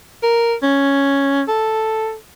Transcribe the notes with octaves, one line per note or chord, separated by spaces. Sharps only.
A#4
C#4
A4